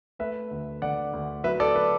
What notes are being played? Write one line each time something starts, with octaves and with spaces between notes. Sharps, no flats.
A3 B4 E5
D2
D3 D5 F#5
D2
F#3 B4 E5
A4 D5
B4